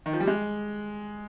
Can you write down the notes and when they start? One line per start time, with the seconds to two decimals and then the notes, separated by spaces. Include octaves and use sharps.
0.06 D#3
0.13 F3
0.20 G3
0.27 G#3